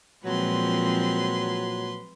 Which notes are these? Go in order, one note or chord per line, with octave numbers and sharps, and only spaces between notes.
A#2 F3 F#3 G#3 C4 B4 C6